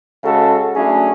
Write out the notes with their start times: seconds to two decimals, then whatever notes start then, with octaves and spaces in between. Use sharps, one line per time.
0.24 C#3 G#3 F#4 A4
0.76 F#3 A3 C#4 D4 E4 G#4